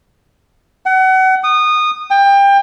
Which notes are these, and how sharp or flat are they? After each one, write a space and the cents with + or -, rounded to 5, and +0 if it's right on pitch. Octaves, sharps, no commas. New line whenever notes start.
F#5 +30
D#6 -20
G5 +25